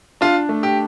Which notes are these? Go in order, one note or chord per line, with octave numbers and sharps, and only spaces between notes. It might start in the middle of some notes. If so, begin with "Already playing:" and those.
D4 F4
A3
G4